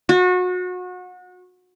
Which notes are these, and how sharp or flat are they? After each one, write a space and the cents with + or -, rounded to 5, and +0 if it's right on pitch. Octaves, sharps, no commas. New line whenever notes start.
F#4 -30